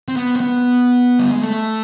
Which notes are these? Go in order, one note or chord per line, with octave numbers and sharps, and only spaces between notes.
C4
B3
C4
B3
G3
G#3
A3